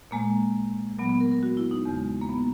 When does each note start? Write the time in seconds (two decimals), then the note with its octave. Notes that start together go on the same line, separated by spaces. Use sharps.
0.11 A#2 G#3 A#3
0.99 A#2 F#3 B3
1.09 B3
1.20 A#4
1.32 A#4
1.43 F#4
1.57 E4
1.71 D#4
1.85 E2 C#3 G#3
2.21 A#3
2.29 B3